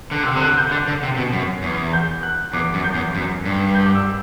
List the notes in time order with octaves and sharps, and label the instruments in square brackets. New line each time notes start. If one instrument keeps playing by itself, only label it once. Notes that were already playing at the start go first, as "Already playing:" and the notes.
[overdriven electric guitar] D3 [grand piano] F#6
[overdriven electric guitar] C3 [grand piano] E6
[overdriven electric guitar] D3
[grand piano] F#6
G6
[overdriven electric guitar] D3 [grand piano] A6
[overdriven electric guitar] D3
C3
B2
F#2
E2
[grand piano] G6
F#6
[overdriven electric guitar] E2 [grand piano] D6
[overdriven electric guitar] F#2
[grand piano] G6
[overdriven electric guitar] E2
F#2
G2
[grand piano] G6
D6
E6